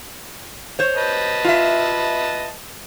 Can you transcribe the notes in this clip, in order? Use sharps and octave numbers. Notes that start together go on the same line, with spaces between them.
C5 C#5
B4 D#5 A5
F4 E5